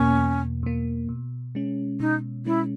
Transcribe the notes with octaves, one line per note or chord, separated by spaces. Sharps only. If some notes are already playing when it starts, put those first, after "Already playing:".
Already playing: E2 B2 A#3 C#4
E2
B2 A#3
B2
G#3 C#4
B2 D#4
G#3 C#4 E4